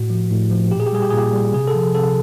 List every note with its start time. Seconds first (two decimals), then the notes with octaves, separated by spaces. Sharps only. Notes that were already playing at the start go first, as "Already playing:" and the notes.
Already playing: A2 F#4
0.10 F3
0.31 A2
0.51 F3
0.71 A#2 G4
0.80 G#4
0.87 G4
0.92 G3 G#4
1.02 G4
1.10 A#2 G#4
1.18 G4
1.33 G3
1.54 C3 G#4
1.68 A4
1.75 F3
1.95 C3 A4